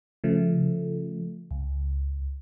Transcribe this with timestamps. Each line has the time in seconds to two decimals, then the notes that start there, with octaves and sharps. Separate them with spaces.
0.24 C#3 F3 A3
1.51 C#2